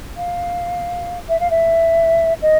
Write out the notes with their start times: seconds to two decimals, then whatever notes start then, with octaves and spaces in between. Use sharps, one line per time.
0.16 F5
1.29 E5
1.40 F5
1.50 E5
2.42 D#5